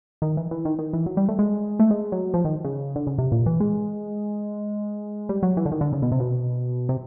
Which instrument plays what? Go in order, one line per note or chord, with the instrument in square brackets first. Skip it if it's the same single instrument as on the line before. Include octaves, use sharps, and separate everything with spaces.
[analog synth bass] D#3
E3
E3
D#3
D#3
E3
F#3
G3
A3
G#3
A3
G#3
F#3
F3
D#3
C#3
D3
C#3
C3
A#2
E3
G#3
G3
F#3
E3
D3
D#3
D3
C#3
B2
C3
B2
C3